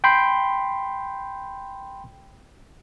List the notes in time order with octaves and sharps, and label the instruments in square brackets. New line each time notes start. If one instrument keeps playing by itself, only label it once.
[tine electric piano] G5 B5 C6 G6